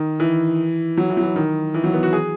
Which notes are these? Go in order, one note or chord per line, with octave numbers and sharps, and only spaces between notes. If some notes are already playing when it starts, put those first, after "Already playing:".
Already playing: D#3
E3
F#3
E3
F#3
E3
D#3
E3
F#3
B3
F#4
G#4